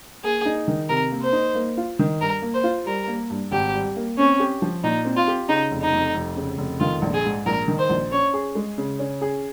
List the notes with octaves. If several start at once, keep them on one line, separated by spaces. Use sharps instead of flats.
A#3 G#4
D#4
D#3
C3 A#4
A#3
C5
D#4
A#3
F4
D#3
G2 A#4
A#3
C5
F4
G3 A#4
A#3
G2
G#1 G4
G3
A#3
C4 C#4
G4
F3
A#2 D#4
C4
F4
G4
C#3 D#4
F1
D#4
F2
F1
C#3
F1
D#3 F4
A#1
G#4
G#2
A#1 A#4
D#3
C5
A#1
C#4 C#5
G#4
G#3
C#3
C#4
G#4